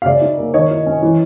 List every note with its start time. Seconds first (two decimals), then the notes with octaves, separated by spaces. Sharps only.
0.02 F5
0.06 C#3 D5 E5
0.21 D#4
0.38 A#3
0.54 D#3 C#5 D#5
0.70 E4
0.86 C#4
1.02 E3